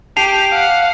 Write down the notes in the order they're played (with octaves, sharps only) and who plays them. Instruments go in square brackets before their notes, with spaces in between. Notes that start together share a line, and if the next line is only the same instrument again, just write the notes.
[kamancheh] G4 [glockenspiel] A5 C7 F7
[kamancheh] F5 F#5